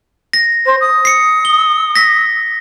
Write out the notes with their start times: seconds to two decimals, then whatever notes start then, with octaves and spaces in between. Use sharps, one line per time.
0.33 A#6
0.66 C5
0.81 D#6
1.05 C7 C#7
1.45 G7
1.96 A#6 B6